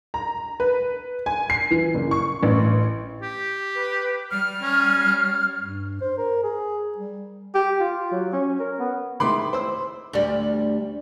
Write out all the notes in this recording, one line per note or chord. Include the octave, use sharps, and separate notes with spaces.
A#5
B4
G#5
C7
E3
F#1
C#6
A1
G4
B4
G3 F6
C#4
G2
C5
A#4
G#4
G3
G4
F4
F#3
C#4
A#4
B3
D#3 G#3 E4 B5 C6 D6
C5 E6
D2 G3